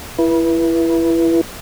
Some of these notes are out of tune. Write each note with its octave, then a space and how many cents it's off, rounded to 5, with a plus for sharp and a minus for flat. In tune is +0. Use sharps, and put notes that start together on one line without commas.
E4 +20 B4 -25